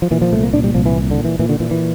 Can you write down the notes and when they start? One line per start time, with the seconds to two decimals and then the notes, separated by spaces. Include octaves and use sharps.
0.02 F3
0.11 A#2 E3
0.22 F3
0.32 C2 A3
0.43 A#3
0.53 A#2 D4
0.64 G3
0.74 C2 F3
0.86 E3
0.96 A#2
1.11 D3
1.18 A#2
1.25 E3
1.39 A#2 E3
1.49 D3
1.60 A#2 E3
1.71 E3